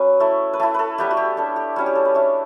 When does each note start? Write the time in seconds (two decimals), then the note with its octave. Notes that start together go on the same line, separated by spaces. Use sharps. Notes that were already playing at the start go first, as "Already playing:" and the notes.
Already playing: F#3 C#4 B4
0.20 A3 E4
0.53 B4
0.60 A3 E4 A4
0.74 A4 B4
0.98 G3 B3 E4 G4
1.11 F#4
1.17 G4
1.37 A3 D4 A4
1.56 G4
1.76 G3 C#4 E4 F#4
1.86 G4
1.95 A4
2.05 B4
2.15 A3 D4 C#5